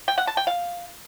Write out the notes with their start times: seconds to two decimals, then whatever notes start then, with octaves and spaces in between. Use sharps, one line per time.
0.08 G5
0.18 F#5
0.27 A5
0.37 G5
0.47 F5